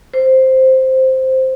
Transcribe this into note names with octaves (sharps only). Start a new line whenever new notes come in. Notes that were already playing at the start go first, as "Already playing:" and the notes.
C5